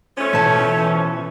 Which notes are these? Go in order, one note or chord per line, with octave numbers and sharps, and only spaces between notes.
F3 A3 C#4
B2 E3 A5